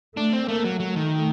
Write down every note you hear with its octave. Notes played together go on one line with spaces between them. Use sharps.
A3 D4
C4
A3 A#3
F#3
F#3 A3
D#3